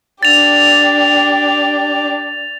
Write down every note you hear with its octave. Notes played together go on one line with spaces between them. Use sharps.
D4 G4 A6 F7